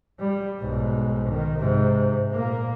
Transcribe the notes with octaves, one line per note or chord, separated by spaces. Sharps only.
G3
B1 G#2
D#3
G#2 C3
A#2 A#3